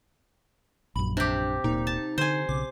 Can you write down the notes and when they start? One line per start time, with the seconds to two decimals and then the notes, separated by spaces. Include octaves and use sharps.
0.96 A#1 F#2 B5
1.17 C3 D4 G4
1.64 D1 A#2 D#4
1.87 A5
2.18 D3 C5 G#5
2.49 B1 C#3 D6